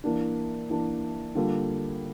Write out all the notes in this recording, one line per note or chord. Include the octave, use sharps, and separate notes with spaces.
E3 A#3 D4
E3 A#3 D4
D3 G3 A#3 F4 A4